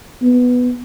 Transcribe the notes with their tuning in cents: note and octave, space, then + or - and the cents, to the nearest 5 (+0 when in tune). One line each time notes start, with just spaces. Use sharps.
B3 +5